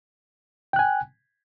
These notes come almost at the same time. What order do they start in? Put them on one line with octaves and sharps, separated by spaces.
G5 F#6 G#5